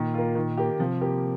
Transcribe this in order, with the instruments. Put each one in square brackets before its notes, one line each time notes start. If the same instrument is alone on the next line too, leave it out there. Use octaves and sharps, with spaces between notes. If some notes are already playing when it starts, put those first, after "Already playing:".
Already playing: [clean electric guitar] A#2 [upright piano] D#3
[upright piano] A#3 F4
D#3
A#3 G4
[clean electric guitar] C3 [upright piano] F3
[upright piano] A#3 G4